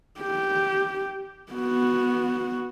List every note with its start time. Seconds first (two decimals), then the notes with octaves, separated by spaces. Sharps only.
0.20 G4
1.52 B3 F#4